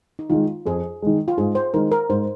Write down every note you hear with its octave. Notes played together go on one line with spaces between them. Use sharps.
D#4
D#3 G#3 F4
F2 G#4
D#3 G#3
F4
G#2 G#4
C5
D#3 G#3 A#4
A#4
G#2 C5